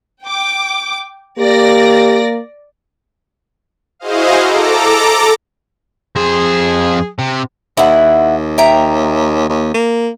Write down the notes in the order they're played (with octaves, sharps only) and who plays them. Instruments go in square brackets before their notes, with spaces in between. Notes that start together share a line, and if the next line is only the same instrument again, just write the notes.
[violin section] G5 D6
[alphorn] A#3 [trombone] G4 [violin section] D5 A#6
[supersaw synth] E4 F#4 G#4 C5 D#5 F5
A4 A#5 D6
[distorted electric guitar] F2 C5 [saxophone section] G#4
[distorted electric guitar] C3
[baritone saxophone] D#2 [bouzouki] E4 F#5
[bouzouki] E5 G5 A#5
[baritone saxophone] D#2
A#3